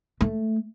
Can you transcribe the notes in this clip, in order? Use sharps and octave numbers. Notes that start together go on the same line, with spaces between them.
A3